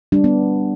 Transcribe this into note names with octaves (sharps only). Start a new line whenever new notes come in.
G3 D4
B3